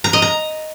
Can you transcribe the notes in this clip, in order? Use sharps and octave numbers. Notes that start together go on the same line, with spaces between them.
A#5
D#5
A#5